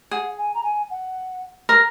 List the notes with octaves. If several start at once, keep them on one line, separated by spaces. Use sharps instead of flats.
G#4 F#5
G#5
A#5
G#5
F#5
A#4 A#5